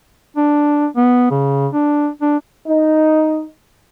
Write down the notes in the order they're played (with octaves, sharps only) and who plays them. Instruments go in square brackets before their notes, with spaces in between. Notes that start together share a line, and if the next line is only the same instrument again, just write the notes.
[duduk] D4
B3
C#3
D4
D4
[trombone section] D#4